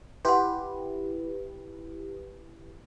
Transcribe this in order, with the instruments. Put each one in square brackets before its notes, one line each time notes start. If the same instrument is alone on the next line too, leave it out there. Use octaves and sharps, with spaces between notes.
[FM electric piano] E4 G4 B4 [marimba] F#5 C6